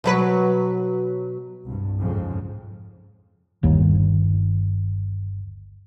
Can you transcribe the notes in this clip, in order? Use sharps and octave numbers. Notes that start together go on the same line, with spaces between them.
B2 F#3 B4
C2 G2
F2 G#2 C#3 F3
G1 D#2